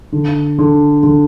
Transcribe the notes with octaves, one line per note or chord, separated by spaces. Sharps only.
D3
D3
D3